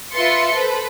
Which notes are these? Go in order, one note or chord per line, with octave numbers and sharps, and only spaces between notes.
F4 B4 E5 C6 A6 C#7
A4 B4 C5